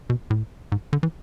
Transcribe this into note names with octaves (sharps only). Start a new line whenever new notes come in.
B2
A2
G#2
D3
E3